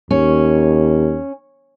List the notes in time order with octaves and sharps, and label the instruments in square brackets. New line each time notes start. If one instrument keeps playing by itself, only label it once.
[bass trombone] D#2 [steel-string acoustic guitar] C#4